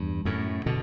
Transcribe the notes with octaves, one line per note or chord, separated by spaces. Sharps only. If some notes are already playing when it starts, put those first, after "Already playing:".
Already playing: E2 G2
F#2 A2
B2 D3